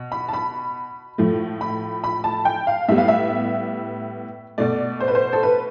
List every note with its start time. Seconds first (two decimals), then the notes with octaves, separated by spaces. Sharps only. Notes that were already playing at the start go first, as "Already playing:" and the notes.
Already playing: B2
0.12 B5
0.28 A5
0.33 B5
1.18 A2 F3 A3
1.61 B5
2.04 B5
2.24 A5
2.45 G5
2.67 F5
2.89 A2 G3 B3 E5
2.98 F5
3.08 E5
4.58 B2 A3 D5
5.00 C5
5.08 B4
5.15 C5
5.33 A4
5.43 B4